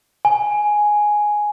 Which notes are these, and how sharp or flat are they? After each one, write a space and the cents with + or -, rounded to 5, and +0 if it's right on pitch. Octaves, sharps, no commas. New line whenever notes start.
G#5 +5